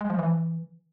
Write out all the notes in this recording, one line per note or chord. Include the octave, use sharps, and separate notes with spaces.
G#3
F3
E3